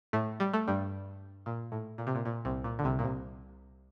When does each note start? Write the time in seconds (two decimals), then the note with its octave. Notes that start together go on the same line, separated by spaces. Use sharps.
0.13 A2 A3
0.40 G3
0.54 A3
0.68 G2 G3
1.46 A#2
1.72 A2
1.98 A#2
2.07 C3
2.15 A#2
2.25 A#2
2.45 C2 C3
2.64 A#2
2.79 D3
2.84 C2 C3
2.99 A#2
3.04 C2 C3